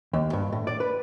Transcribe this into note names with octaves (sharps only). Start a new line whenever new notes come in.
D#2
G2
A2
D5
B4